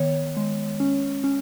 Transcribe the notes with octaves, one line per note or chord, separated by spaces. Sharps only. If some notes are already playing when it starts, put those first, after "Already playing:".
Already playing: D#3 B3 C#5
G#3
C#4
C#4